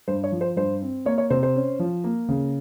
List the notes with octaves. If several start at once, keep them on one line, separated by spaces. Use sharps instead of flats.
G2 C5
C#5
F3
C5
G2 C5
C4
A#3 C#5
C#5
C3 C5
C5
C#4
F3
A#3
C#3